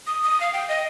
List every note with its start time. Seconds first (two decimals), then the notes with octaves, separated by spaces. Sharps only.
0.07 D#6
0.23 D#6
0.41 F5
0.53 G5
0.69 D#5